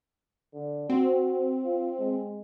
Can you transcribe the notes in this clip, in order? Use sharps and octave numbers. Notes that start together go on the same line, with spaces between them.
D3
C4 F#4
F4
G#3